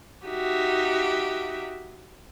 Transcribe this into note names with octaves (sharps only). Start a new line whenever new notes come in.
D#4 F#4 G4 E5